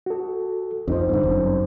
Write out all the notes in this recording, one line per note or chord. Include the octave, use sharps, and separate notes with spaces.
F#4 A4
F2 F3 C4 D#4 C5
G2 D3
G1 F#2